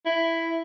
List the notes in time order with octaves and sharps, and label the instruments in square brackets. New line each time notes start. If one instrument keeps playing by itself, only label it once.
[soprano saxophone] E4